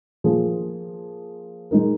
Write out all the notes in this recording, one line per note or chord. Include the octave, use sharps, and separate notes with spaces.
F3 A#3 G#4
G#3 D#4 A#4